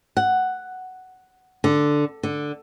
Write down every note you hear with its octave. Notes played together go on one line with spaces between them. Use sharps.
F#5
D3
D3